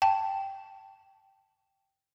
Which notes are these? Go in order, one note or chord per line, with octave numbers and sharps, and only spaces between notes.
G5 A5